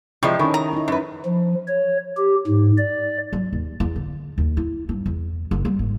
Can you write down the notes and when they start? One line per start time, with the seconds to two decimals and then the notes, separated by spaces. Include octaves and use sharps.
0.23 C3 F3 G3 G#3 E4 D#5 C#6
0.39 D#3 C#4 A4 G#5 B5 C#6
0.54 A#5
0.73 D#4 E4
0.88 F#2 B4
1.25 F3
1.67 C#5
2.17 G4
2.47 G#2
2.77 D5
3.33 F#3
3.53 D#2
3.80 E2
3.96 D3
4.38 D#2
4.57 E4
4.89 G2
5.06 E2
5.51 F#1
5.65 G3
5.79 G#1